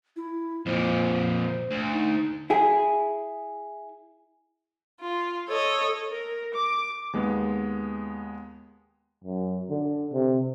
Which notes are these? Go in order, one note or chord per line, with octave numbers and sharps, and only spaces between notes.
E4
F2 A#2 C5
D2
D#4
E4 G#4
F4
A4 C#5 D#5
A#4
D6
D#2 G#3 B3
F#2
D3
C3